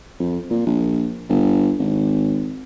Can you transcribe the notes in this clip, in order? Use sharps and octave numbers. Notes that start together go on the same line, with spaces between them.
F2
A#2
A#1
G1
G#1